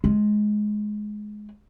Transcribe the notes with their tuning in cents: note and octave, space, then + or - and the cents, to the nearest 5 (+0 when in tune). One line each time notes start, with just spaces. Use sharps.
G#3 +15